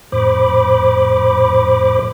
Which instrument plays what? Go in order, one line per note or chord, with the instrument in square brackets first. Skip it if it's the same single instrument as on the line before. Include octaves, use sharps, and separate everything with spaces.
[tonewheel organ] F2 A2 C5 B5 D6